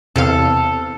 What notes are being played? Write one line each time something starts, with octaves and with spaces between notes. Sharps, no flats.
E2 C3 A4 F5